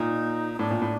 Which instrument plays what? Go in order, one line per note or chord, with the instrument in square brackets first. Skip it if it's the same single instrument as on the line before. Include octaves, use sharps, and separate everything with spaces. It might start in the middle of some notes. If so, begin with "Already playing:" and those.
Already playing: [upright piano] A#2 [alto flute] D#4
[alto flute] D#4
[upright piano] A2 [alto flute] D4
[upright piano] A#2
A2